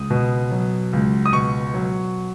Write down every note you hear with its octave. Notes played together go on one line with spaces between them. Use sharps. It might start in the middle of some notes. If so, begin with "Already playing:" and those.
Already playing: C#2 D#6
B2
F#3
C#2
D#6
B2 C#6
F#3